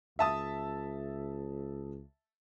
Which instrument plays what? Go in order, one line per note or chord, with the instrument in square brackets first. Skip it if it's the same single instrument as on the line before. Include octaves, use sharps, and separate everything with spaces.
[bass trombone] C#2 [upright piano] E5 A5 D#6